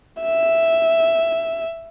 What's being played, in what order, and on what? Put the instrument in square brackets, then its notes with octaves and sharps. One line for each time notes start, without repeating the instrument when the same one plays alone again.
[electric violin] E5